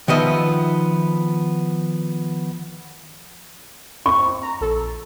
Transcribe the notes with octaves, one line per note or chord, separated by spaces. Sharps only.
D#3 F3 B3 D#5 E5
C4 C#6
A#5
A#1 A4